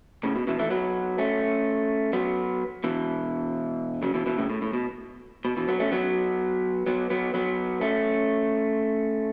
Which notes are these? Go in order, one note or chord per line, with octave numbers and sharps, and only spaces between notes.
A2 C#3
B2
B2 E3
E3 A3
F#3 B3
A3 C#4
F#3 B3
B2 E3
C#3 F#3
B2 E3
B2 E3
A2 C#3
A2
A2
B2
B2
B2 E3
F#3 B3
A3 C#4
F#3 B3
F#3 B3
F#3 B3
F#3 B3
A3 C#4